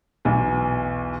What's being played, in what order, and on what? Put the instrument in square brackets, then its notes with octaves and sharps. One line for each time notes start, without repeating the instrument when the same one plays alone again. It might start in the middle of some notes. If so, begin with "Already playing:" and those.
[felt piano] B1 E2